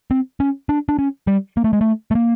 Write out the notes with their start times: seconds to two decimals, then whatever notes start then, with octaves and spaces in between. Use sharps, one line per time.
0.11 C4
0.40 C#4
0.69 D4
0.89 D4
0.99 C#4
1.27 G3
1.57 A#3
1.64 A3
1.73 G#3
1.81 A3
2.11 A3
2.15 A#3